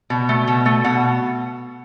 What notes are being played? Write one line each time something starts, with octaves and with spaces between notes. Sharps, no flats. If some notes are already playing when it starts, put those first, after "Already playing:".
B2
A3
B2
A3
B2 F#5